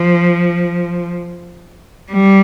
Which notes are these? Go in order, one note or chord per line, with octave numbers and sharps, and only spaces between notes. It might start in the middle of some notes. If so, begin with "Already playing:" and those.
Already playing: F3
G3